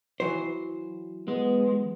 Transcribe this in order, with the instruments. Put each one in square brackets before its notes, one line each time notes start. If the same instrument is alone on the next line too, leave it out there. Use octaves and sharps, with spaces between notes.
[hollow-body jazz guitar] E3 F#3 C5
[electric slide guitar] G#3 [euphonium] B3